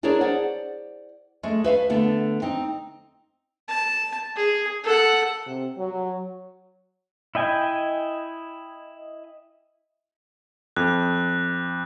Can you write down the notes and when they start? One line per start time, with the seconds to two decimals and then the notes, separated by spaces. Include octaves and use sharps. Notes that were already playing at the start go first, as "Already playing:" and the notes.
0.03 D4 E4 G#4 A#4 C#5 D5
0.21 C5 D5 F#5
1.43 G#3 A3
1.64 B4 E5 F5
1.90 D3 A3 B3
2.42 C4 D#4
3.68 A5
4.36 G#4
4.84 A4 F#5
5.46 C3
5.78 F#3
7.35 E4 D#5 G5 G#5
10.76 F2 F#6